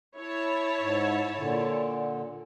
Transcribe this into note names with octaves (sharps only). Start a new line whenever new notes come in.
E4 C#5 A5
G#2
A#2 D3